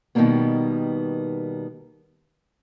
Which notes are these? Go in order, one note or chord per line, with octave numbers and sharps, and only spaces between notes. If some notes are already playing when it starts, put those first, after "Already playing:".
B2 D#3 F#3 G3 A#3 B3